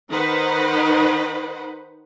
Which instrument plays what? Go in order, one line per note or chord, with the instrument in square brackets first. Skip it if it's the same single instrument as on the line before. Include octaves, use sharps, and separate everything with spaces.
[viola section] D#3 D#4 B4 C5 F#5